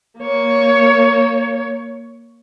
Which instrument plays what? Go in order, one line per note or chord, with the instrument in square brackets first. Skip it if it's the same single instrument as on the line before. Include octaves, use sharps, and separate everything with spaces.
[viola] A#3 C#5